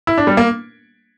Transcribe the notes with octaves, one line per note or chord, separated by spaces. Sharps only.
E4
D4
G3
A#3